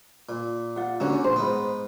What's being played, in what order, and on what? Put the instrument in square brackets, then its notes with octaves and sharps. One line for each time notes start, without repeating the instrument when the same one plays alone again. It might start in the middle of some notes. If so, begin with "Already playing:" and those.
[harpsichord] A#2
[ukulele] F4 F#5
[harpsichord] D#2 D3 [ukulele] C#4 F#4 C#5
[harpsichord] A#1 [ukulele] C5
[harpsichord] G#2 B3